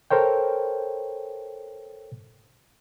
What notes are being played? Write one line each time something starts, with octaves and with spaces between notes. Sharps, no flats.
A4 A#4 C5 C#5 G5